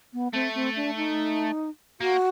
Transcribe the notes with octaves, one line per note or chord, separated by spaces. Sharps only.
B3
A3 C4
C4
D4
D#4
A#3 F#4